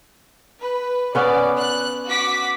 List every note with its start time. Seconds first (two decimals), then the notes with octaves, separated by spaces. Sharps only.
0.61 B4
1.15 B3 C#4 B4 D5
1.58 F#6
2.07 F#4 D6 B6